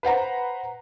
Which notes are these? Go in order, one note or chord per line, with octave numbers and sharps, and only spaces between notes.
B4 C5 F#5 A#5